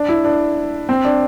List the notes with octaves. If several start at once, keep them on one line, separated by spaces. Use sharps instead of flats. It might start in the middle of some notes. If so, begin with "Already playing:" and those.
Already playing: D4
E4
D4
C4
D4